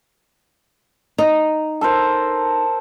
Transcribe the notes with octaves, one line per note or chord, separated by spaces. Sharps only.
D#4
A4 A#4 C5